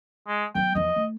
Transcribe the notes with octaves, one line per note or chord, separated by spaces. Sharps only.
G#3
F#3 B3 G5
E2 F3 D#5
A3